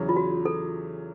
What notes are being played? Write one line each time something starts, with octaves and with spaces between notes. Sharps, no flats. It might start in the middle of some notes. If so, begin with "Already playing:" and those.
Already playing: E2 C#3 F#3
F4
F#4
A4